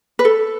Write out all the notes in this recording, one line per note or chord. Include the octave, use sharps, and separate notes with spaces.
B4
A4